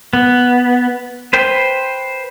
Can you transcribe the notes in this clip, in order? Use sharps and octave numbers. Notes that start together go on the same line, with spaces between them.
B3
B4 C5 G5